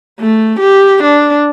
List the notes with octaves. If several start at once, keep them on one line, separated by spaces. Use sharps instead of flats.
A3
G4
D4